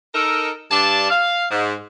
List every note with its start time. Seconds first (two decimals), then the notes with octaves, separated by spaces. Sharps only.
0.14 D#4 A4 A#4
0.71 G2 D4 A5
1.10 F5
1.51 G#2